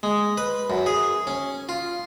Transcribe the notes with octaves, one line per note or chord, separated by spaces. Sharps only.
G#3
B4
F#2
G#4
C#4
F4